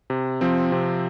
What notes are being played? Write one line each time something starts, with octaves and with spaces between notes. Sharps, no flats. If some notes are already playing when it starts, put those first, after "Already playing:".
C3
F3 C4
C3